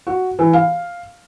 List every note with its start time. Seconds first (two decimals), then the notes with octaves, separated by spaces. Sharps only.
0.07 F#4
0.39 E3
0.53 F5